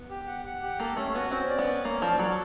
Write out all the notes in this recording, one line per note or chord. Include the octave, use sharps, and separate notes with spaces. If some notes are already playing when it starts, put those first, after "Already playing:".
Already playing: B3
G4
F#5
F#5
G4
A#3 A4
A3 C#4
B3 F#4
C4 C#4
D5
B3
C#4
A#3 C#4
F3 D5
F#3 A4